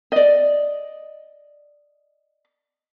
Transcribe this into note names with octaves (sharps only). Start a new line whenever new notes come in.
D5 D#5